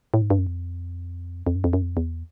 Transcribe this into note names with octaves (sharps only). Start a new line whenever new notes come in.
A2
G#2
G2
F#2
F2
F2
F#2
F2
F#2
F2
E2